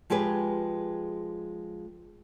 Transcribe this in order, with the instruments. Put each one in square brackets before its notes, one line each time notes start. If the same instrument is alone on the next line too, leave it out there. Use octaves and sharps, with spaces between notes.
[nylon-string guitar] F3 G#3 G4 G#4 B4